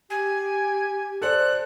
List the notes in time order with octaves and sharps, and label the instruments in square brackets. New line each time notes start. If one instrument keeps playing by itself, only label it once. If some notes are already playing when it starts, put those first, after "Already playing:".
[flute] G4 [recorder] G#5
[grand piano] A4 C5 D5 [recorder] F#6